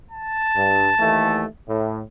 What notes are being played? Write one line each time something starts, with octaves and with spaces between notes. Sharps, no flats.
A5
G2
D#2 E3 A3
A2